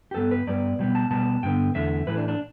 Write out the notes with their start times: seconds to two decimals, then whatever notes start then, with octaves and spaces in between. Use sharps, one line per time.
0.11 G4
0.14 G2 G3 B3 A4
0.31 B4
0.47 G2 G3 B3 D5
0.79 B2 G3 B3
0.95 A5
1.11 B2 G3 B3 A5
1.43 G2 D3 B3 G5
1.75 E2 D3 A3 E5
2.07 A2 E3 A3 B4
2.18 D4
2.28 D4